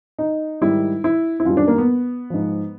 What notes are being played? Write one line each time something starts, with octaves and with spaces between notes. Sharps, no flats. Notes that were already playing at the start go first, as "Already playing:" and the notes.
D#4
G#2 D#3 G3 E4
E4
E4
F#2 D#3 G3 F4
D4
A#3
B3
G#2 F3